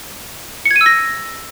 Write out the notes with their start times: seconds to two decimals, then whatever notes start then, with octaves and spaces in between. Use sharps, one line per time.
0.65 C#7
0.71 G#6
0.76 D#7
0.81 E6
0.86 A#6